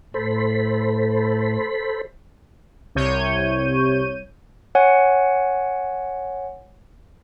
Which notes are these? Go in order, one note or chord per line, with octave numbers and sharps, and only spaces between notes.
A2 A4 C5 B5
C2 C3 C#5 G6 D#7
C#5 F#5 G#5